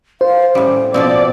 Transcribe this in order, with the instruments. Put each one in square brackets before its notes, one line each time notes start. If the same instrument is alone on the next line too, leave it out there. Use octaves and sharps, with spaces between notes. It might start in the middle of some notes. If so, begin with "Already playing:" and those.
[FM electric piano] C5 [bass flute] F5
[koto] A2 G3 [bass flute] C#4
[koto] B2 F3 C4 [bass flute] B3 [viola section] D5